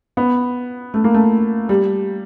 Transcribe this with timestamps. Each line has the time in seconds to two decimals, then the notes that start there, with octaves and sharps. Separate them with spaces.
0.17 B3
0.94 A3
1.04 A#3
1.14 A3
1.69 G3